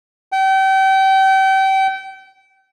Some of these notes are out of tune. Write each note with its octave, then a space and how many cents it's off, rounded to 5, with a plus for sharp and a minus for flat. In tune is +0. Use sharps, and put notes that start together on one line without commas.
G5 -35